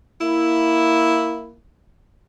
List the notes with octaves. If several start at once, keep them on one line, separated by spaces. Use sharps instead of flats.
A#3 E4